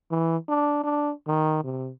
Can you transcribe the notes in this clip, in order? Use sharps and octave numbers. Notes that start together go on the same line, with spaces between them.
E3
D4
D4
D#3
C3